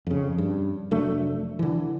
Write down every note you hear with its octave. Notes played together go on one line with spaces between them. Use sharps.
F2 C#3
G2
F1 F#3 A3 D4
D3 E3